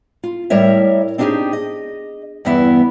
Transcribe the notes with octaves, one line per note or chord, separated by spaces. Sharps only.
F4
A2 G3 A#4 C#5 E5
C4 D4 D#4 F4 G4 G#4
D#5
E2 G2 E3 B3 E4 E5